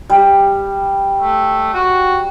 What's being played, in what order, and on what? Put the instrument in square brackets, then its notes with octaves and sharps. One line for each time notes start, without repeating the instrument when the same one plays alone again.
[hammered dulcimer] G3
[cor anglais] A3
F#4